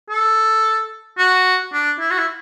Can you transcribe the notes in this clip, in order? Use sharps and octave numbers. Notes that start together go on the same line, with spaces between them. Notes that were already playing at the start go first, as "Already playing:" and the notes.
A4
F#4
D4
E4
F#4
E4